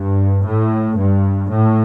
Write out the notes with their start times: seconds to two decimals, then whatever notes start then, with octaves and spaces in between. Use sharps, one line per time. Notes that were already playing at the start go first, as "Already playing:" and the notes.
Already playing: G2
0.44 A2
0.97 G2
1.50 A2